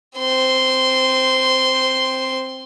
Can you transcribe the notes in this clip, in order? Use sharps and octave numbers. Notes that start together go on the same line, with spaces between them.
C4 C6